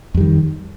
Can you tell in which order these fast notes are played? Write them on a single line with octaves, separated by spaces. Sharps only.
F2 G3 D#3